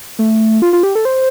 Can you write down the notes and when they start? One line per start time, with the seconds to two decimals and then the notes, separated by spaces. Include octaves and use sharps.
0.19 A3
0.62 F4
0.73 F4
0.83 G4
0.95 A4
1.05 C5